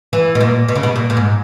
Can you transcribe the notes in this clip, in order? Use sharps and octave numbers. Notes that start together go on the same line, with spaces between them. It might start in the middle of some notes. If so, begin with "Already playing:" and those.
E3
B2
A#2
B2
C#3
B2
A#2
A#2
G#2